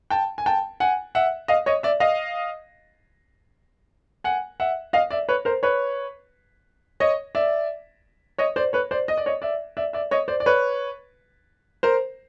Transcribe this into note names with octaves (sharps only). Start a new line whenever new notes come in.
G5 A5
G#5
G5 A5
F#5 G#5
E5 F#5
D#5 F5
C#5 D#5
D5 E5
D#5 F5
F#5 G#5
E5 F#5
D#5 F5
D5 E5
B4 C#5
A#4 C5
B4 C#5
C#5 D#5
D5 E5
C#5 D#5
C5 D5
B4 C#5
C5 D5
D#5
D5
C#5 D#5
D5 E5
D5 E5
D5 E5
C#5 D#5
C5 D5
D5
B4 C#5
A#4 C5